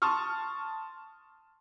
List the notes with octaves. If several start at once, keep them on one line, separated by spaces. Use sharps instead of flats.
A5 C6 C#6 D#6 F6